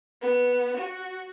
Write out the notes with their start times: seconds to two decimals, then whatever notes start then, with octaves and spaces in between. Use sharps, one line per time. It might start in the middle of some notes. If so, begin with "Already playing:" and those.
0.21 B3
0.76 F#4